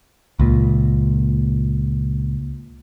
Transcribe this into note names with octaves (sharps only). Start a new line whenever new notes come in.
C#2 A#2